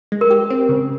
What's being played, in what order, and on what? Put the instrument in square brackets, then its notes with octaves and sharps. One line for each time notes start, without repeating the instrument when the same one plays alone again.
[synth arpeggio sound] G#3
[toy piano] A#4
[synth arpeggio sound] G4
C4
C#3